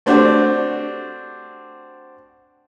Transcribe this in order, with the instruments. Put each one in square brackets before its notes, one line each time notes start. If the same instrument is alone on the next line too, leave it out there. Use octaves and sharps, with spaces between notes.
[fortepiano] A3 C4 D4 F#4 G4